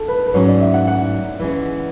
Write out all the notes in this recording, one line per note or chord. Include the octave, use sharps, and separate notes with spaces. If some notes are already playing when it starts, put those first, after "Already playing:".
Already playing: A4
B4
B4
G#2 F#3 C#4 C#5
D5
E5
F#5
F#5
E3 G#3 C#4